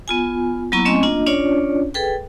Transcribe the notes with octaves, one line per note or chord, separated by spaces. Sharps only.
B3 F4 G#5
F#3 A#3 B3 E4 A#5 C#6
A3 C4 C#4 D#5 G#5 C#6
A#3 D4 F4 D#5
C#4 D4 F4 C#5 D5
G#4 A4 B4 G5